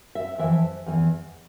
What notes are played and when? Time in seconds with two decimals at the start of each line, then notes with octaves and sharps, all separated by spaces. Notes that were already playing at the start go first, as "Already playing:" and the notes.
0.15 E5
0.38 F2 E3 E5
0.86 E2 E3